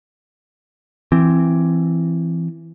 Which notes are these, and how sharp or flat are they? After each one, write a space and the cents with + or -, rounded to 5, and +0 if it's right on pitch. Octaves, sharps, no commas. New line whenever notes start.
E3 +20 C4 +0